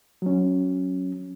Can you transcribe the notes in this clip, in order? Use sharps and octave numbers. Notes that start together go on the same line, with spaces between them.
F#3 C#4